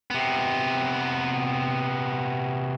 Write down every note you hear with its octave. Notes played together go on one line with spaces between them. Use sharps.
C3 B3